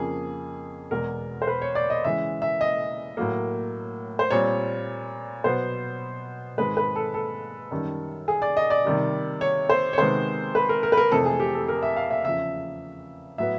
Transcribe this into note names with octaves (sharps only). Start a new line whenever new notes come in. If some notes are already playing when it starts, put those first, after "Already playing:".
Already playing: F2 C#3 F3 A#3 G#4
E2 B2 G#3 A#4
C5
B4
C#5
D5
D#5
C#3 E3 G#3 E5
E5
D#5
A2 F#3 A#3
C5
A#2 G3 C4 C#5
B2 F#3 B3 C5
G#2 D#3 G#3 C4 B4
B4
A4
A4
F#2 D#3 G3
G#4
D5
D#5
D5
C3 D#3 G3
C#5
C5
C#5
C3 D#3 G#3 B3 C5
B4
A#4
A#4
B4
A#4
F2 C3 E3 A3 C4 A4
G#4
G4
A4
A#4
E5
F5
E5
E2 C#3 F3 E5
A2 F#3 B3 E5